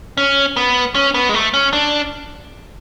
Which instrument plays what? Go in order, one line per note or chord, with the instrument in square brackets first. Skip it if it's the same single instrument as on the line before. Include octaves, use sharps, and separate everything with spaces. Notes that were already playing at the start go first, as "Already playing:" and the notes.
[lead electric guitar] C#4
B3
C#4
B3
G#3
A3
C#4
D4